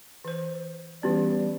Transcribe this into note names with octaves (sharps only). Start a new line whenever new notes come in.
E3 C5
E3 G3 B3 C#4 G4